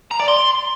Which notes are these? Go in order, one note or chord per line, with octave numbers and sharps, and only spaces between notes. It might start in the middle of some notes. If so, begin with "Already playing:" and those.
A#5
D5
C6